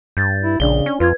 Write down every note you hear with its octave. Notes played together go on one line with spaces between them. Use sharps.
G2 G6 A6
E4
A#1 C#3 D4 D5 G7
C#4
F2 F4 B4 G#6